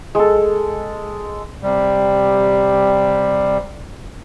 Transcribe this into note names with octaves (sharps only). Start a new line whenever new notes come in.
G#3 A4
C3 G3